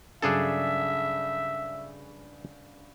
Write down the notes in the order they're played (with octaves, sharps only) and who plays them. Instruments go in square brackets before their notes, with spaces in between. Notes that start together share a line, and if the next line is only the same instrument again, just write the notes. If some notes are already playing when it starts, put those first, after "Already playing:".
[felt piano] G2 C#3 F#3 [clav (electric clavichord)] D4 G#4 A4 [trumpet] E5